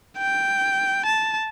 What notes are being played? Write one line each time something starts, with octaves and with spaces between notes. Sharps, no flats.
G5
A5